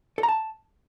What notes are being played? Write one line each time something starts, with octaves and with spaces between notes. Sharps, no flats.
A4
A#5
A5